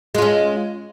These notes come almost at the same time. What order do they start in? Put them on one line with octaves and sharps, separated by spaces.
G#3 F4 C#4